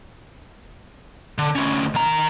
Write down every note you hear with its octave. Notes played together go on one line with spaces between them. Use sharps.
D3
D2 C#4
D#3 A#5